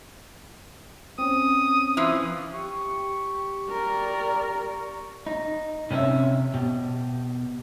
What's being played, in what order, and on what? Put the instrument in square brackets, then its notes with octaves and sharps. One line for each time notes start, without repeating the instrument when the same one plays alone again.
[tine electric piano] C4 C#4 [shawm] D#6
[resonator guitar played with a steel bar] E3 F3
[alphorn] G4 [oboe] C#6
[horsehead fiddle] A#4 D5
[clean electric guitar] D#4
C3 C#4 E4 C#5 E5
B2 G4